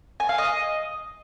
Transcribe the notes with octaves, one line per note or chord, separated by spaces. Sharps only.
G#5
F5
D#5